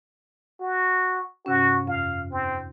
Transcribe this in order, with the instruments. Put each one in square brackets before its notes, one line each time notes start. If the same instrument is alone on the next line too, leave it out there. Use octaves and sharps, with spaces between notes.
[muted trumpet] F#4
[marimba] G2 C3 C#4 [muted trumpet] F#4
[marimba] F2 [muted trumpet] F5
[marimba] D#2 [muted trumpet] C4